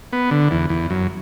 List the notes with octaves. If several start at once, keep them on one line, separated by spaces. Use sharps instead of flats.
B3
D3
E2
E2
F#2